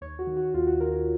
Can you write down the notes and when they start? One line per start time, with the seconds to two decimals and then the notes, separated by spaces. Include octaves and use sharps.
0.01 D#2 C#5
0.19 F#4
0.27 D#3
0.37 F#4
0.54 D#2 F4
0.67 F#4
0.80 D#3 A#4